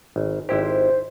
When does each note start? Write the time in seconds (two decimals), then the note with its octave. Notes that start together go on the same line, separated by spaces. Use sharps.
0.16 G#1
0.49 G#1 E4 G4 C5